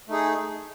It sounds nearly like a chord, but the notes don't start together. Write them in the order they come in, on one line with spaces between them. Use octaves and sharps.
A3 D#4 G#4